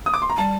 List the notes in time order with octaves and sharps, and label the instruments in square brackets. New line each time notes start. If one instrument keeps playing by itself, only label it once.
[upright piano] D#6
D6
C6
A#5
[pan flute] G3 [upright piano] A5